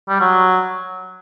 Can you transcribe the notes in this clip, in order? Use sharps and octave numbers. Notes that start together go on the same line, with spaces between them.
G3
F#3